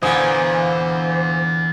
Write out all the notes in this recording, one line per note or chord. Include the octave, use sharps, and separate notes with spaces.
A#2 D3 E3 B3 C5 F#5 G#5 D#6